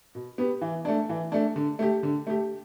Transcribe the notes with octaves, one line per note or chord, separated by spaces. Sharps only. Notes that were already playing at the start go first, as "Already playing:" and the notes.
B2
B3 G4
E3
A3 D4
E3
A3 D4
D3
A3 G4
D3
A3 G4